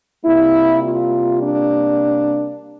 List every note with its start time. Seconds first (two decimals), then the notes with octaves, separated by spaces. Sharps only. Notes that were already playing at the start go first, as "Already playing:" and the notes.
0.25 C3 G3 A#3 E4
0.84 F4
1.43 D4